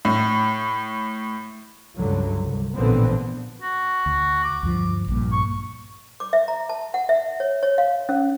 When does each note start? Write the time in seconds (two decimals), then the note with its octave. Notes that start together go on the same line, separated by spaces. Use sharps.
0.05 A2
1.97 C#2 G2 D3 F#3
2.42 C2
2.74 A1 A#2 D3 F3 B3 C4
3.62 F#4
4.06 D2
4.44 D6
4.63 D2 G2 F3
5.08 A#1 G2 A#2
5.32 C#6
6.20 D6
6.33 E5
6.48 A#5
6.69 A5
6.94 F#5
7.09 E5
7.40 C#5
7.63 C#5
7.78 F5
8.09 C#4